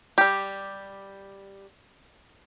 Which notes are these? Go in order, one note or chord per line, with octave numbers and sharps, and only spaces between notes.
G3 G4